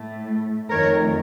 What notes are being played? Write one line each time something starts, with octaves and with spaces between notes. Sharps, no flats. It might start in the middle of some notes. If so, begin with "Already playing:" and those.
Already playing: A2 A3
F2 D#3 A3 A#4 C#5